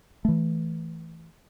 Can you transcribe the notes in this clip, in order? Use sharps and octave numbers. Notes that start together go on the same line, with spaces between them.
E3 A3